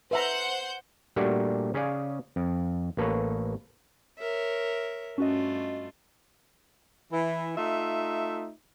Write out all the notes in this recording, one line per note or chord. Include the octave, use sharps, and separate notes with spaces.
B4 C5 E5 F#5 A#5 G6
A#2 G3 A3 D4 F#4 G4
C#3 C#4 G#4 D5 F5
F2
A1 A#3 A4 B4 C#5
A#4 C#5 E5
G2 A3 C#4 F4 F#4 D#5
E3 E4
A3 D#4 F4 E5